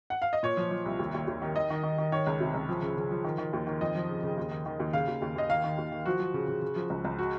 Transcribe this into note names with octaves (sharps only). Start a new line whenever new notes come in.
F#5
F5
D#5
A#2 C#5
F3
F3
C2
D#2
D#2
D#2
D#3
D#3 D#5
D#3
D#3
D#3
D#3 C#5
C#2
C3
C#2
F3
C#3
C#3
F3
D#3
D#3
D#2
D#3
F2 D#5
F3
C#3
C#3
D#2
D#3
D#3
D#2
C#3 F5
D#2
D#2
D#2 D#5
D#3 F5
D#3
D#2
D#3
F3 F#4
F3
C#3
C#3
C#3
F3
C#2
C#2
F#4